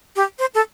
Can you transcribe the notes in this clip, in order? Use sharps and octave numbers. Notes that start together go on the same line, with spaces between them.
G4
C5
A4